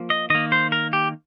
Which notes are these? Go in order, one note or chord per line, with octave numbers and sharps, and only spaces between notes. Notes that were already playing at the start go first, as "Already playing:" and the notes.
Already playing: F3 A#3
D#5
D#3 A#3 D#5
C5
A#4
G4